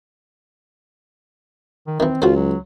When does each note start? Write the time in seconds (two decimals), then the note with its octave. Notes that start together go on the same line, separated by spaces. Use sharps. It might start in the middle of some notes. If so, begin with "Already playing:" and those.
1.87 D#3
2.00 D#3 E3 C4
2.22 C#2 F4 F#4 A4 C5
2.35 F#3